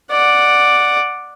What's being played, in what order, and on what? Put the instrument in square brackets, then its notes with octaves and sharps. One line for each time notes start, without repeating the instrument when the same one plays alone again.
[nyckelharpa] D5 F#5